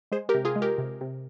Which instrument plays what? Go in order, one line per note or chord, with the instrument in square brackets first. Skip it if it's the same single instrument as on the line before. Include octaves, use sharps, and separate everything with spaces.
[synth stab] G#3 G#4 C5
G4 A#4
C3
F4 G#4
G#3
G4 A#4
C3
C3